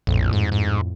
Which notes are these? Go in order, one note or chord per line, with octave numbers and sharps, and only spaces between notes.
A#1 F2 A2
G#2
G#2